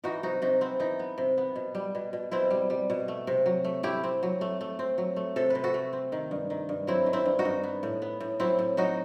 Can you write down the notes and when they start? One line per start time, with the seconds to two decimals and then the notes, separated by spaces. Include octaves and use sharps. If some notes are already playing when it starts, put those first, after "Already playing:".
0.04 E3 D#4 F#4
0.23 C3 D#4 F#4
0.42 C3 D#4 F#4
0.61 B3 C4
0.80 E3 D#4
0.99 B3
1.18 C3
1.38 B3
1.56 B2
1.75 G3
1.95 B2
2.13 B2
2.31 B2 C4 E4
2.50 G3
2.70 G3
2.90 B2
3.08 A3
3.27 C3
3.46 F#3
3.64 A3
3.83 A3 E4 G4
4.04 C4
4.23 F#3
4.41 A3
4.61 A3
4.79 C4
4.98 F#3
5.16 A3
5.36 C3 A4
5.50 C3 B4
5.64 F#4 A4
5.74 A3
5.93 C4
6.12 D#3
6.31 G2
6.50 D#3
6.69 G2
6.87 F#3 C4 E4
7.06 D#3
7.13 C4 E4
7.26 G2
7.39 D#4 F#4
7.45 G2
7.64 B3
7.83 A2
8.02 B3
8.20 A2
8.40 F#3 C4 E4
8.59 A2
8.77 F#3 D#4 F#4